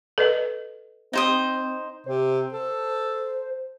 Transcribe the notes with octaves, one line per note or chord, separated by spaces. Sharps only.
A4 B4 D#5
C4 D#4 C5 D#6
C3 C5
A4